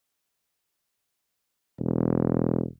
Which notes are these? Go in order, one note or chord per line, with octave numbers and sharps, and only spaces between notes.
E1